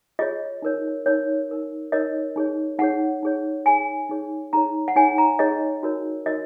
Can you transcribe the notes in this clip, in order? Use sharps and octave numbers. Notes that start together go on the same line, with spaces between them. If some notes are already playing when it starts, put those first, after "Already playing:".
F4 G#4 C#5 D#5
D#4 A#4 C#5
D#4 A#4 C#5
D#4 A#4 C#5
D#4 A#4 C#5 D#5
D#4 G#4 C#5
D#4 G#4 C#5 F#5
D#4 G#4 C#5
D#4 G#4 C#5 G#5
D#4 G#4 C#5
D#4 G#4 C#5 A#5
F#5
D#4 G#4 C#5 G#5
A#5
D#4 G#4 C#5 D#5
D#4 F#4 A#4 C#5
D#4 F#4 A#4 C#5 D#5